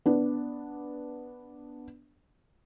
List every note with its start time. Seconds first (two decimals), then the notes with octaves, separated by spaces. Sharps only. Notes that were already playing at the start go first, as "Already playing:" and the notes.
0.06 B3 D4